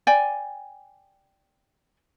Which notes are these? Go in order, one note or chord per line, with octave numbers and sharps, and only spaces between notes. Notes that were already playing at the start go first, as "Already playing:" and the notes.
D5 G5 G#5